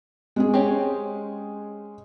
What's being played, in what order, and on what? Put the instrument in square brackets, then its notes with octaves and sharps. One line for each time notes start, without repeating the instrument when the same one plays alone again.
[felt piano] G#3 C#4 G#4
[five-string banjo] C4 G4 C#5